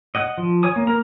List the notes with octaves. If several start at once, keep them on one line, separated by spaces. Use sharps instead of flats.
D#5 F#5
F3
C#5 G#5 D#6
A#3
A#3 A#4 A#5